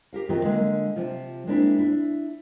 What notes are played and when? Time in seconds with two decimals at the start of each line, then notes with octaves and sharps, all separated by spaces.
0.13 G4 A#4 F5
0.29 D#3 C4 F4 F#4 A#4 E5
0.44 D3 G#3 A#3
0.96 C3 F3 F4
1.47 G#3 A#3 C4 D4 E4
1.78 D4 E4